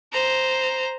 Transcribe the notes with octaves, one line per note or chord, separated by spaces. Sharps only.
C5 A#5